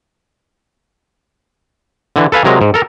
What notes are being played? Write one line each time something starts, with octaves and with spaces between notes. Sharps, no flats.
D3 E3
A4 B4 F5 G#5
C3 F#3 G#3 A#4
G#2
A4 A#4